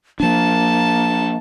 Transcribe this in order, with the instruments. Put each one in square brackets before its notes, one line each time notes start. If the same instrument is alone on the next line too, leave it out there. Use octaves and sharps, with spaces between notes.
[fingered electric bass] F3 D4 [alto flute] A#3 [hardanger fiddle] A5